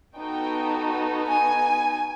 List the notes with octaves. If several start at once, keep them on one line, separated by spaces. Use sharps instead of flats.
B3 D#4 F#4 A4 G5
G#5